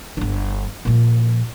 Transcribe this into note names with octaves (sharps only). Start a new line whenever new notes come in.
G1 D3
A#2 F3